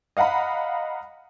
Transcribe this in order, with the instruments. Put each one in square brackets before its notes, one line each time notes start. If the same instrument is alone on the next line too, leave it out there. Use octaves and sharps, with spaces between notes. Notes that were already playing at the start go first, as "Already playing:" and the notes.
[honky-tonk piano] D#5 F5 F#5 A#5 B5